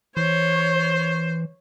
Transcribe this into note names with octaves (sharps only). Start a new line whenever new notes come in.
E3 C5 C#5